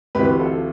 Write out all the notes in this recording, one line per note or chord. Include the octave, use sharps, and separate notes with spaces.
D2 C3 E3 G4 B4
F4 A4